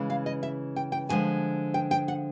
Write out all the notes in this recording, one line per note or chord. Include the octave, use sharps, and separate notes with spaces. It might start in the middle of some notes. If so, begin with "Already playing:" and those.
Already playing: C#3 E3 G#3
F5
D#5
E5
G5
G5
F2 D3 F3 G#3 G#5
G5
G5
F#5